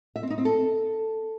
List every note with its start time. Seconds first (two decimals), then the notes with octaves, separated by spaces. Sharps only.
0.16 E5
0.23 C4
0.30 D#4
0.38 C4
0.45 A4